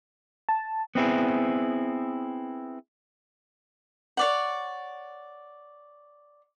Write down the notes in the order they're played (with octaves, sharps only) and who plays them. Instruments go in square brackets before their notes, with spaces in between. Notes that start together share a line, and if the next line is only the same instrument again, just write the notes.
[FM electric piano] A5
[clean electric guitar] B3 C4 E4 G#4
[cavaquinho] C#5 D5 F#5